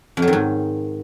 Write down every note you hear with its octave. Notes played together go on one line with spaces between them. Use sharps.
F2
F#3
D#3
G#2